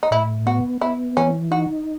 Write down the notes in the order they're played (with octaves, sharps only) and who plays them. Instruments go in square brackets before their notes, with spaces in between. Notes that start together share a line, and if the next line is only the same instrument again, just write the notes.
[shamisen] D#4
[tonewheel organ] A2 [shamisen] E4
[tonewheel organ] B3 [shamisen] F#4
[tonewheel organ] B3 [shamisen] E4
[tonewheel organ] E3 [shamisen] C#4
[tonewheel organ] D#4 [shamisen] F#4